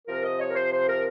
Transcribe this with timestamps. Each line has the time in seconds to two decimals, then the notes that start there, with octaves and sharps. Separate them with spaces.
0.07 C3 F3 A#4
0.23 D#5
0.39 C#5
0.48 A#4
0.55 C5
0.71 C5
0.87 A#4